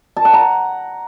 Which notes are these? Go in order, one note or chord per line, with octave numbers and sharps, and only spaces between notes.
A5
F#5
A#5